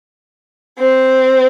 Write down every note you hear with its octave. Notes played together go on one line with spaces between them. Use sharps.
C4